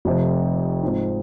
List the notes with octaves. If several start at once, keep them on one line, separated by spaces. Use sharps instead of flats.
F1 F2 C3 F3
G#2 F3 C4 D#4